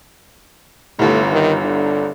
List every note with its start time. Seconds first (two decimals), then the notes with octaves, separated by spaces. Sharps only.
0.99 G1 C2 A3
1.32 D#3
1.64 D3